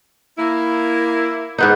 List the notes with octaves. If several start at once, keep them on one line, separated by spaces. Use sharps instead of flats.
A#3 E4
G#2 B3 D#4